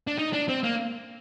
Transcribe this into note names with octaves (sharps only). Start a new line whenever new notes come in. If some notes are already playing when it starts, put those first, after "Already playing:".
D4
D#4
D4
C4
A#3